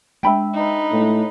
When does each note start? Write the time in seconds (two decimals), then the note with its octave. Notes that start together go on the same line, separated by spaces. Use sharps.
0.23 G#3 D4 E5 G5 B5
0.53 D#4 B4
0.92 A2